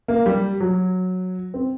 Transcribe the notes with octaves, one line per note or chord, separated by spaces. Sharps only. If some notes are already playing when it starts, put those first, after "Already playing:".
A#3
G3
F#3
C4